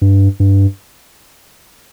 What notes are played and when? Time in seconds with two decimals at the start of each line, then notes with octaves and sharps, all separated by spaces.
0.02 G2
0.40 G2